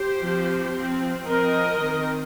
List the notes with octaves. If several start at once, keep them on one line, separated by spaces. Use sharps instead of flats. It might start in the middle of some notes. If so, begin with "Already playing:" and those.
Already playing: G4 C5
F3 C4
F3 C4
F3 C4 A#4 D#5
D#3 C4